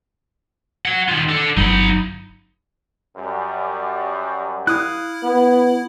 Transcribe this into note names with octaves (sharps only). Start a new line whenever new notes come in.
C#5 F#5
D#3 F4
D4 A4
G1 F#3 D#4 B5
F#2 G3
E4 F5 D#6 F#6
B3